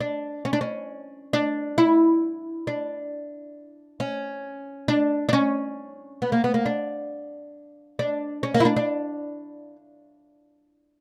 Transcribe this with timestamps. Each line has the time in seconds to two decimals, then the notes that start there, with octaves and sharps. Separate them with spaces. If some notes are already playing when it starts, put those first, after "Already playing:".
0.01 D4
0.45 C#4
0.53 D4
0.61 C#4
1.33 D4
1.78 E4
2.67 D4
4.00 C#4
4.88 D4
5.29 D4
5.33 C#4
6.22 B3
6.32 A#3
6.44 B3
6.54 A#3
6.66 D4
7.99 D4
8.43 C#4
8.54 A#3
8.60 E4
8.65 D4
8.76 D4